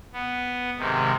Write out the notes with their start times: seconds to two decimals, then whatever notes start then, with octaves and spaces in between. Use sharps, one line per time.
0.13 B3
0.78 G#2 C3 D#3